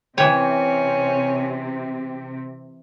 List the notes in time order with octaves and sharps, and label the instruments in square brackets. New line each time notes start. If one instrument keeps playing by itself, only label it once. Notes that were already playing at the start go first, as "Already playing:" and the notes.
[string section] C3 [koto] E3 C#5 [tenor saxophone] C#4 [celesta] G5